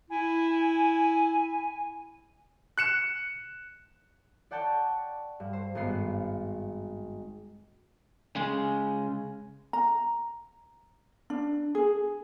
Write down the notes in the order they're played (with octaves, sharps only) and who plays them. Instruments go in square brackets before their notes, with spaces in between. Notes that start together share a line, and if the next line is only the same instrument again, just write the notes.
[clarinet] E4 [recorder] G#5
[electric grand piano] F#6 C#7 E7
[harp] D5 F#5 G5 A5 C#6
G2
C5
G#1 G2 B3 C7
[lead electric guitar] C#3 G#3
[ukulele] A#5
D4
G#4